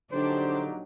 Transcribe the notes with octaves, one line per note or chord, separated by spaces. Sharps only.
A#1 D3 F#3 D4 D#4 G4 C5